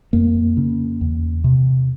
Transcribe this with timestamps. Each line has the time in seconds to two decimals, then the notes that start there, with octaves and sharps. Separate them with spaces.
0.13 F2 A#3
0.57 C#3
1.01 E2
1.44 C3